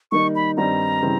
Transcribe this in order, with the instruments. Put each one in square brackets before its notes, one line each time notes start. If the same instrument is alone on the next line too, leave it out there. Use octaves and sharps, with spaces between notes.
[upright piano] D#3 G3 A#3 D#4 [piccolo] C#6
[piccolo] B5
[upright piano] G2 D#3 G3 C4 D#4 [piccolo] A#5
[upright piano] C#3 E3 G3 C4